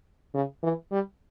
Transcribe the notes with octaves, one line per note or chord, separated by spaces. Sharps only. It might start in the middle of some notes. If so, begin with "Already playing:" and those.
C#3
E3
G3